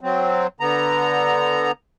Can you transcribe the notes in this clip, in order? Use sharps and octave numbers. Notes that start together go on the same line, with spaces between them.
F#3 C4
D3 B3 A#5